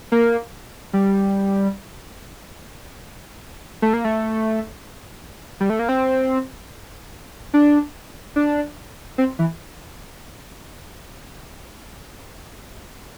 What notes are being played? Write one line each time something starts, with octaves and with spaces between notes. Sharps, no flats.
A#3
G3
A3
A#3
A3
G3
A3
A#3
C4
D4
D4
C4
E3